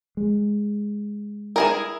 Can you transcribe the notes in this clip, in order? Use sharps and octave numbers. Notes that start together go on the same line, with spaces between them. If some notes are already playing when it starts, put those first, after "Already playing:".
G#3
E4 G#4 A#4